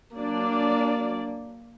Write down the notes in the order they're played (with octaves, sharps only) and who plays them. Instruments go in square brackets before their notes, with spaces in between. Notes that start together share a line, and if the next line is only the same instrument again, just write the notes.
[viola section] F#3 D4 D5 [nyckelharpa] A#3